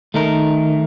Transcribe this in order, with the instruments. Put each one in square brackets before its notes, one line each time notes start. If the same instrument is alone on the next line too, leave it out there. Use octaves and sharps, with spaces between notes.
[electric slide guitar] D#3 [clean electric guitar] A3 D#4 A#4